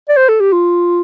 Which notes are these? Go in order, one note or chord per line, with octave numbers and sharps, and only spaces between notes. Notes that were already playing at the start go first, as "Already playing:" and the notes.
D5
C5
A4
G4
F4